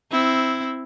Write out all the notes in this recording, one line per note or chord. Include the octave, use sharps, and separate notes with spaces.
C4 E4